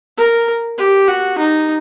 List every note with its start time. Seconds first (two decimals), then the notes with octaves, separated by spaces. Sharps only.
0.17 A#4
0.78 G4
1.07 F#4
1.38 D#4